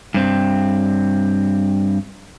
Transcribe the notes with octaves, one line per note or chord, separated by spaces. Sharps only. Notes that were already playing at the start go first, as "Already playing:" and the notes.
G2 C4